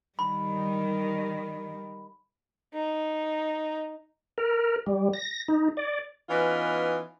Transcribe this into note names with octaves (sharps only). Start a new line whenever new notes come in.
D#3 G3 B5
D#4
A#4
G3
A#6
D#4
D5
E3 B3 C#4 D#4 F4